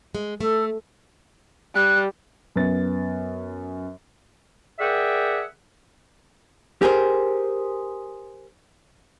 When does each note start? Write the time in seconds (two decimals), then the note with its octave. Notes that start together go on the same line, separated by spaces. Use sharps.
0.15 G#3
0.41 A3 A4
1.75 G3 F#6
2.56 F#2 B3 A6
4.79 G#4 A#4 D5 E5 F#5 G5
6.82 G4 G#4 A#4 C5